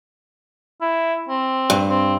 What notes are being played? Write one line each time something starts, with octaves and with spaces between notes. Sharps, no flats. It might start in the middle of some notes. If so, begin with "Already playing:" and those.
E4
C4
G2
C4